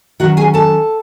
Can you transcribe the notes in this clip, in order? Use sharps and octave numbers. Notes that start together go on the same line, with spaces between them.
D#3 F#3 C#4 F#4 F#5
G#4 G#5
A4 A5